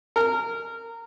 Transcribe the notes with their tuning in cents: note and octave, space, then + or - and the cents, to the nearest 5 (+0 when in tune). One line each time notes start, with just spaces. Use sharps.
A#4 -20